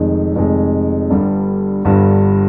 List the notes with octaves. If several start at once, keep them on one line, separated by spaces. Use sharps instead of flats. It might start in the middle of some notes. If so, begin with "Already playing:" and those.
Already playing: F1 F2 D#3 G#3
F1 F2 D#3 G#3
G1 G2 D3 G3
G1 G2 D3 G3